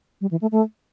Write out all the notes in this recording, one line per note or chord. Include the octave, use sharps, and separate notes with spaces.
G3
E3
A3
A3